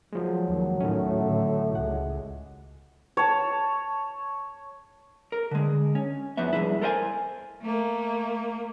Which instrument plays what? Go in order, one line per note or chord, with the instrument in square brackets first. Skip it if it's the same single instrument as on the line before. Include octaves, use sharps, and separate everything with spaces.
[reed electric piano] F3 G#3 [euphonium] F#3
[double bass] D#2
[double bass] A2 [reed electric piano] D#3 C#4 [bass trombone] A3
[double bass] A2 D3
[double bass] C#2 G#3 [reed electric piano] F#5
[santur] C#5 A5
[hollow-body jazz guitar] A#4
D3 G#3
C#4
E2 E3 F3 B3 E5
G2 A#2 G#3 E4
A4 A#4 C5 D#5 G#5
[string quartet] A3 A#3